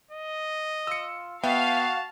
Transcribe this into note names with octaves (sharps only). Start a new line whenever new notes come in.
D#5
F4 E6 C#7
B3 F#4 E5 F5 G5 A5